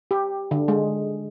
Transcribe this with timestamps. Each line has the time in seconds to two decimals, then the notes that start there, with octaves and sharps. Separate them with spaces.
0.11 G4
0.51 D3
0.68 G#3